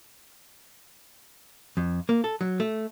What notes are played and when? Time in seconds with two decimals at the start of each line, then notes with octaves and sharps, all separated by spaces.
1.77 F2
2.09 A#3
2.24 A4
2.41 F#3
2.60 A3